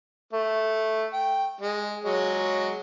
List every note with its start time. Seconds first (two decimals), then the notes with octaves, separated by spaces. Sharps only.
0.33 A3
1.14 G5
1.61 G#3
2.04 F#3 G#3 C#5